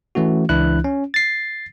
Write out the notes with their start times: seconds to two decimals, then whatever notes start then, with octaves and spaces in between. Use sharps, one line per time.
0.15 E3 A3 C#4 F#4
0.49 C#2 E3 D4 E4 F#6
0.84 C#4
1.14 A6 C7